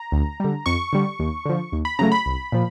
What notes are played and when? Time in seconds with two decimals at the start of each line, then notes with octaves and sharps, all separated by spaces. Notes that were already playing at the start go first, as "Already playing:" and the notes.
Already playing: A#5
0.12 D2
0.40 D3 G3
0.66 F2 C#6
0.93 D3 G3
1.19 D#2
1.46 D3 F3
1.72 D#2
1.85 B5
1.99 C#3 F#3 A3 A#5
2.12 B5
2.26 C2
2.52 A#2 F3